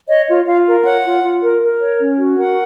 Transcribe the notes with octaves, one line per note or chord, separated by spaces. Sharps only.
C#5 D#5
F4
F4 F5
A#4
C#5 F#5
F4
F4
A#4
A#4
C#5
C#4
F#4
A#4 F#5